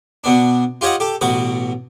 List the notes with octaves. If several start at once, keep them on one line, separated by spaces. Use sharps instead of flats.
B2 B3 D4
F4 G4 C#5 D#5 F#5
G4 A4
A1 B2 B3 D6